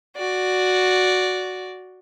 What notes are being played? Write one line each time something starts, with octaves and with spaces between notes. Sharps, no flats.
F#4 D5